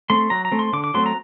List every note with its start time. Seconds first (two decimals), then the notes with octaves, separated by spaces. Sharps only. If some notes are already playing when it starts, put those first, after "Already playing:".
0.10 A3 C4 C6
0.30 F#3 A#5
0.45 A#5
0.52 A3 C4
0.59 C6
0.73 D3 D6
0.84 D6
0.94 F#3 A3 C4 C6
1.06 A#5